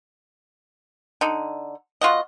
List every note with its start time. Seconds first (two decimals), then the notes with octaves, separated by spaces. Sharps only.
1.21 D3 D#4
2.01 B3 F4 F#4 D#5